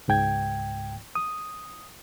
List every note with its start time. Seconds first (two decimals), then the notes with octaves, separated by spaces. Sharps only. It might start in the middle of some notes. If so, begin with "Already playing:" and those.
0.08 C#2 G#2 G5 G#6
1.15 D#6